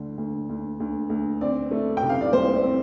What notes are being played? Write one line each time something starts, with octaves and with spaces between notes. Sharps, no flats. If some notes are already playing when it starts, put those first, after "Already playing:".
Already playing: D2 D3
D2
D2
D2
D2
C4 D5
A3
G5
C3
F5
D5
C2 C5
C4